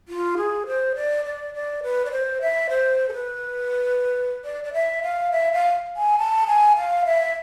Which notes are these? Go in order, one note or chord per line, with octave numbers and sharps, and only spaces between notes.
F4
G#4
C5
D5
D5
D5
B4
D5
C5
E5
C5
A4
B4
D5
D5
E5
F5
E5
F5
G#5
A5
G#5
F5
E5